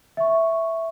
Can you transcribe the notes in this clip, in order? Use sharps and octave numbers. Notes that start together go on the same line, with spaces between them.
E5 C#6